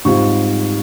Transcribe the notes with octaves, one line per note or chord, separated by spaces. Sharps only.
G#2 G3 C4 F4 C#6